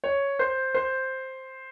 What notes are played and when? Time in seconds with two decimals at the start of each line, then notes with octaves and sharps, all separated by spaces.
0.04 C#5
0.39 C5
0.75 C5